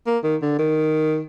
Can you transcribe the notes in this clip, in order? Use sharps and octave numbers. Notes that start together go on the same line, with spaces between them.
A#3
D#3
D3
D#3